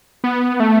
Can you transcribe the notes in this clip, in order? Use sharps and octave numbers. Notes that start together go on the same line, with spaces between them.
B3
A3